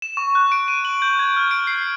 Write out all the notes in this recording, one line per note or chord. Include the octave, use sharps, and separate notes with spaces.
E7
C#6
F#6
D7
D#7
F#7
G6
G#6
F6
D7
C7